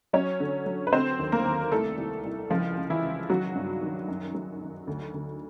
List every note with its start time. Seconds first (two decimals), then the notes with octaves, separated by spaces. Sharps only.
0.13 F#3 C#4 C#5
0.40 D3
0.66 F#3
0.87 B4
0.93 D3 C4 C5
1.19 D#2
1.32 A#3 A#4
1.45 D#2
1.72 C2 A3 A4
1.98 C2
2.24 C2
2.50 C#2 F3 F4
2.77 C#2
2.90 E3 E4
3.03 C#2
3.29 D#3 F#3 F#4
3.55 G2
3.82 D#3
4.08 F#2
4.35 F#3
4.61 D#3
4.87 D2
5.14 D2